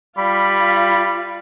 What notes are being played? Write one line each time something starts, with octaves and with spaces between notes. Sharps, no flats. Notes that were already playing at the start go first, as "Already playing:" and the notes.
G3 F4 F5 B5